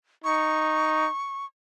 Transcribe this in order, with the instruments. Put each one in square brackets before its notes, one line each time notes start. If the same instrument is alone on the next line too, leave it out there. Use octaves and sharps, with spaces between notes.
[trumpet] D#4 [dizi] C#6